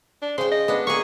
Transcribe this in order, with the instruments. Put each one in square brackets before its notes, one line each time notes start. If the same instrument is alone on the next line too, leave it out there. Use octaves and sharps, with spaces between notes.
[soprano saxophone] D4
[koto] C#3 G5 [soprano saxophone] C5
[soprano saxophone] D#5
[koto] B3 D4
[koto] A#3 G#4 [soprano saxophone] C#6